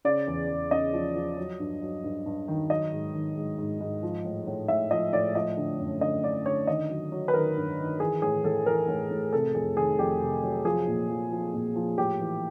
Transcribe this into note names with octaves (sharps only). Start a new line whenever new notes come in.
C#3 D5
E2
E2
C#3 D#5
F3
F3
F#3
G2
F#3
G2
G2
D#3
F#3 D#5
G#2
D#3
G#2
G#2
G#2
F3
A2
A2
A2 E5
F3 D#5
A2 D5
F3 D#5
D3
F#2
D3 D#5
D3 D5
D3 C#5
D#3 D#5
F#3
F#3
B4
D#3 A#4
G2
D#3
E3 G#4
A2 G#4
A2 A4
E3 A#4
A2
A2
C3 A4
F2 G#4
D#3 G#4
F2 G4
C3
F#3
F3 G#4
A#2
F3
F3
A#2
F3
A2 G4
E3